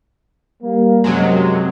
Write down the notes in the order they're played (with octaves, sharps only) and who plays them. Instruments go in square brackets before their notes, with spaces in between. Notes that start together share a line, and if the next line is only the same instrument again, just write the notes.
[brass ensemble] G3 A#3
[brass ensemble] F#2 [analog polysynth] C3 F#3 G#3